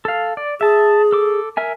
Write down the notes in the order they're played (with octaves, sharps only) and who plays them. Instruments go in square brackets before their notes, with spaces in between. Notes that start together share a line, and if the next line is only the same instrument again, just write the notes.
[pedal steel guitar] A4 F5
D5
[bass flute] G#4 [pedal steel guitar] E5 A5
[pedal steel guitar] A4 D6
A#4 E5 G#5